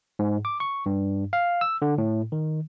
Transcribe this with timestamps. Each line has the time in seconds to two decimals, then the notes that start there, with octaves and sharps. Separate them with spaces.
0.19 G#2
0.45 D6
0.60 C#6
0.86 G2
1.33 F5
1.61 E6
1.82 D3
1.98 A2
2.32 D#3